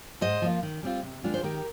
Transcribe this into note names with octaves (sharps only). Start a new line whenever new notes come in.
G#2 C5 D#5
F3 A#3 F4
D#3
G3 C4 F4
C3
D#3 G#3 D4 F4
C5
D#3 G4 A#4